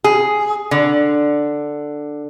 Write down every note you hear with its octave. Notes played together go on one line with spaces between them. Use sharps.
G#4
D3